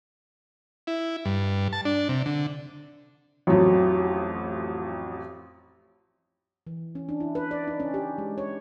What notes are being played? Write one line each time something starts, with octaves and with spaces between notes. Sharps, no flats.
E4
G2
A5
D4
C3
D3
A1 F2 F#3
E3
C#4
D4
E4
B4
D5
D#4
C#4
G4
G#3
C#5